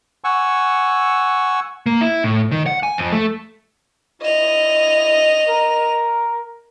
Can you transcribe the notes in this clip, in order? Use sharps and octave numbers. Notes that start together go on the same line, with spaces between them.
F#5 G#5 C#6 E6
A#3
E4
A2
D#3
F#5
G#5
F2
A3
E4 D#5 F7
A#4